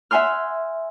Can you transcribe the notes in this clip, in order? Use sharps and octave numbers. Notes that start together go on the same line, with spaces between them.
E5 F#5 G#5 C6 F6